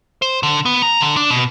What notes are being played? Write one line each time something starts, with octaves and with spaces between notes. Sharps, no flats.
C5
D3
B3
A#5
D3
D4
B2